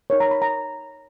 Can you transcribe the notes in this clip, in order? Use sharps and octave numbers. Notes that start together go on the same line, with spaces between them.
D#4 A#4 C#5
A#5
B5
A#5